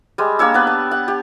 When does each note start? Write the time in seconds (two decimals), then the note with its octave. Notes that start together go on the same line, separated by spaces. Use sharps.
0.18 G3 G#3
0.39 A#3 D4 C#5 E6
0.54 B3 B4
0.67 A5
0.91 F#5
1.08 G4